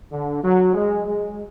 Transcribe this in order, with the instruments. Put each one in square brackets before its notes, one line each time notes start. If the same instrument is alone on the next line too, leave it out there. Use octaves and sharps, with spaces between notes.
[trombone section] D3
F#3
G#3
G#3